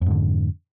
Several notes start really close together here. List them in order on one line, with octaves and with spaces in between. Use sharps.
F2 G#2 D3